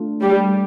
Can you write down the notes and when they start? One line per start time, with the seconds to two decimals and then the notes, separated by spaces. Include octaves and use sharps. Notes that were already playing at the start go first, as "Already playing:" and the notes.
Already playing: A3 D4 F4
0.21 G3